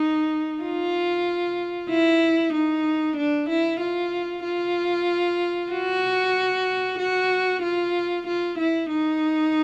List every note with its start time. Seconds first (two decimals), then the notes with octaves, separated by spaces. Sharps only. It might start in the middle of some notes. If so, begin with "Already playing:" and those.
Already playing: D#4
0.62 F4
1.90 E4
2.53 D#4
3.17 D4
3.49 E4
3.80 F4
4.45 F4
5.72 F#4
6.99 F#4
7.63 F4
8.27 F4
8.59 E4
8.90 D#4